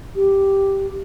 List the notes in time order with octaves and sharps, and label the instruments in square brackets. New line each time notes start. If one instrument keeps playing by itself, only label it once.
[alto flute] G4